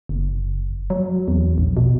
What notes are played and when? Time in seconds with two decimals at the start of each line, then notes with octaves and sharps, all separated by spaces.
0.09 F#1
0.90 F#3
1.28 E2
1.58 A#1
1.77 B2